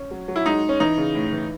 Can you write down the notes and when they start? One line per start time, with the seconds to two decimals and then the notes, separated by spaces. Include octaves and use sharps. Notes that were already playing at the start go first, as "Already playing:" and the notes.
Already playing: C#4
0.11 F#3
0.28 F#3
0.36 E4
0.46 G#3 D#4
0.63 G#3
0.69 C#4
0.80 E3 D#4
0.97 C#3
1.15 A2
1.32 E3